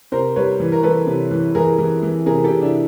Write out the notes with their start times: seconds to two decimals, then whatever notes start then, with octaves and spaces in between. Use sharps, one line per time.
0.12 C3 A#4 C5
0.36 G3 B4 C#5
0.60 E3
0.72 A#4
0.83 E3 A4 B4
1.07 C3
1.31 E3
1.55 E3 G#4 A#4
1.78 E3
2.03 E3
2.26 C3 G#4 A#4
2.44 G4 A4
2.50 C3
2.62 D4 E4